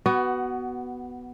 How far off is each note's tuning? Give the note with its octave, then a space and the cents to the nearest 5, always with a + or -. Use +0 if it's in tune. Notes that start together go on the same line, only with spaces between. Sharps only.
B3 +0 F#4 +20